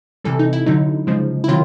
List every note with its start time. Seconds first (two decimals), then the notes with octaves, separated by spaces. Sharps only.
0.24 C3 E3 G3 A4
0.39 D#4
0.53 E4
0.66 D3 F#3 D#4
1.07 C#3 F3 G#3
1.44 E4
1.48 C3 D#3 F#3 F4